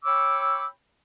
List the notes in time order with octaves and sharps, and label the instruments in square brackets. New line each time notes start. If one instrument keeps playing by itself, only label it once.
[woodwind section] C#5 G5 B5 C#6 D6 E6